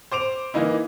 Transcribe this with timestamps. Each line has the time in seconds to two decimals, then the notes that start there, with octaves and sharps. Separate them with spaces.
0.11 C5 D6 D7 F7
0.54 E3 A#3 D#4 E4